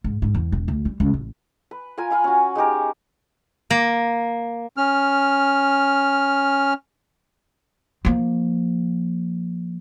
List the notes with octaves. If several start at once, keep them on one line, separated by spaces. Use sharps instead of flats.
G#2
G#2
E2
E1
D2
G3
C#2
A1
B4
F4 A#4 F5 G#5
F4 F5 B5
C#4 F#4
G#3 D#4 G4 A#4
A#3
C#4 F6
F3 A#3